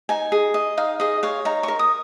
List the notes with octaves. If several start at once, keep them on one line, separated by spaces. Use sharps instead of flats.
D#4 G#5
G#4
D#5
D#4 F5
G#4 D#5
C#5 F5
D#4 A#5
A#4 C#6
D#6